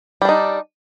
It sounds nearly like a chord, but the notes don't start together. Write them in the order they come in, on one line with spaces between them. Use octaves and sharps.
G3 D4 D#4